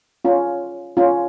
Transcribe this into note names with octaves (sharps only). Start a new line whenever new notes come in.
C#4 F4
C#4 F4